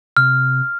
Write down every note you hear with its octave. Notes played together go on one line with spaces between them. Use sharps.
C3 F6